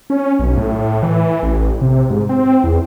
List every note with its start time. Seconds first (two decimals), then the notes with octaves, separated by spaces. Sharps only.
0.10 C#4
0.39 B1
0.57 A2
1.03 E3
1.43 A1
1.81 C3
2.10 G#2
2.29 C4
2.64 E2